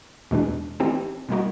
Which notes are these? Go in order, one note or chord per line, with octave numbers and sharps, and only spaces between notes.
E2 B2 G#3 B3 D4
E3 A3 C4 D#4 G4
B2 G3 A#3 D#4 F#4